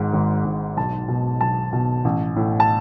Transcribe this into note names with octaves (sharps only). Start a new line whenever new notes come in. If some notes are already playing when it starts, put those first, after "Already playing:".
Already playing: G#1 G#2
G#1
G#2
B1 A5
B2
B1 A5
B2
A1
A2
A5